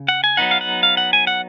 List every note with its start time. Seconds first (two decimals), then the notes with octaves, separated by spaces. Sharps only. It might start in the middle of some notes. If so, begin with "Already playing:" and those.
Already playing: C#3
0.08 F#5
0.24 G#5
0.37 F#3 B3 D#4 F#5
0.51 F5
0.61 F#5
0.83 F5
0.97 F#5
1.13 G#5
1.27 F#5